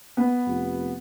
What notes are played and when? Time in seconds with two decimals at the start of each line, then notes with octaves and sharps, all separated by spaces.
0.17 B3
0.46 F1